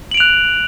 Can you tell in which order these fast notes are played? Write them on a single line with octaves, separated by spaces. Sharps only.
F#7 D7 F7 F#6